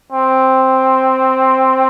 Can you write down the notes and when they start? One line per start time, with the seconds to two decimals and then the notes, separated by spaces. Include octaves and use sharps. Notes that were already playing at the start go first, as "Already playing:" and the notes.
0.12 C4